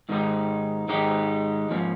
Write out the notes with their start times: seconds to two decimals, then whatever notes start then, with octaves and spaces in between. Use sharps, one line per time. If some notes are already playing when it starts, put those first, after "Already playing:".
0.09 G#2 D#3 G#3 D#4 G4
0.88 G#2 D#3 G#3 D#4 G4
1.69 G#2 F3 A#3 C#4